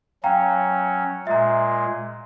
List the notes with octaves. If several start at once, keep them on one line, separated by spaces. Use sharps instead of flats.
F#3 C#4 F5 G5 A#5
A#2 G#3 E5 A#5